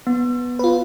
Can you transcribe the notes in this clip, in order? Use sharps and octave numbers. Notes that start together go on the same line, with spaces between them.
B3
F4 B4